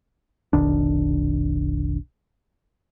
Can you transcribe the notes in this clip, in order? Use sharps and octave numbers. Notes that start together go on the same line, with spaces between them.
F1 B1 D#3 D4